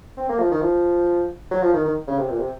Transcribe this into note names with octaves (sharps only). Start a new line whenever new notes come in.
C4
A#3
F3
D#3
F3
F#3
F3
D#3
D#3
C#3
C3
A#2
C3